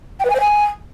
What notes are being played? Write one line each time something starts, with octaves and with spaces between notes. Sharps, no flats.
G5
B4
G#5
C5
G#5